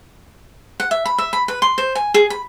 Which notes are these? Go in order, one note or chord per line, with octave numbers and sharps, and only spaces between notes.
F#5
E5
B5
E5
B5
B4
C6
C5
G#5
G#4
B5